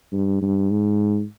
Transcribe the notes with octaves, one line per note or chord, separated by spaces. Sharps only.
G2
G2
G#2